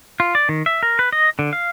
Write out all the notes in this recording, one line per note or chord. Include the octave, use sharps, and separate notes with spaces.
F4
D5
D#3
E5
A#4
B4
D#5
D3
F5